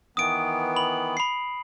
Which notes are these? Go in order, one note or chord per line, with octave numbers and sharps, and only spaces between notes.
D#3 E3 B3 D#6 D7
B5 F#7
B5 C7